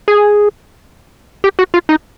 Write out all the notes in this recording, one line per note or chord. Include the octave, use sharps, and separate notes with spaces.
G#4
G4
F#4
F4
D#4